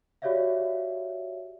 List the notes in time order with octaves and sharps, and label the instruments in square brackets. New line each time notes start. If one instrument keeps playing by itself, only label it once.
[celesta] F#4 G4 C#5 D5 E5 F5